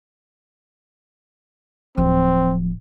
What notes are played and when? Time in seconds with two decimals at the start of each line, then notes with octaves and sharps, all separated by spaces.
1.97 D1 F3 C4